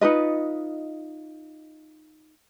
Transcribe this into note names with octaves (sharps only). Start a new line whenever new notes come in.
D#4 F4 B4 D#5